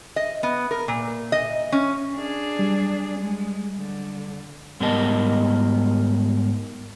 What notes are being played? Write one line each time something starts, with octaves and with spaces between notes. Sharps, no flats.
D#5
B3
A#4
A#2
D#5
C#4
D4 G#4
G3
G#3
D3
G#2 G3 B3 A#4 D#5 A5